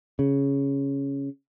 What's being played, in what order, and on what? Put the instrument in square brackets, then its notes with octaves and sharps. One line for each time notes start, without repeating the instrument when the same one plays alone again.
[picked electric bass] C#3